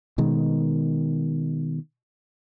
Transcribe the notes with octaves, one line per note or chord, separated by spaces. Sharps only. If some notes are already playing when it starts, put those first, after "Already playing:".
B2 D#3 G#3